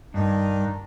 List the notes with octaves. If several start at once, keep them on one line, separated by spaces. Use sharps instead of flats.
G2 D#3 D4 D#4